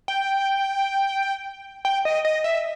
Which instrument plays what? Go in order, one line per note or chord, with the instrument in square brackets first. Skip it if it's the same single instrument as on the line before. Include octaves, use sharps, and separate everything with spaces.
[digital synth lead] G5
G5
D#5
D#5
E5